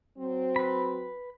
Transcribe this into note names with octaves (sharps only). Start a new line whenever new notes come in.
F#3 C4
B4 B5